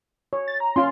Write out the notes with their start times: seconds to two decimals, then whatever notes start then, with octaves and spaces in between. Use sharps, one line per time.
0.33 C#5
0.48 A6
0.60 A#5
0.76 C#4 F4 F5 C6